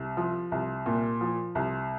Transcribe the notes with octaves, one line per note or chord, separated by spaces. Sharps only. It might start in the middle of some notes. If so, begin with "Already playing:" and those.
Already playing: C2
F3
C2
A#2
F3
C2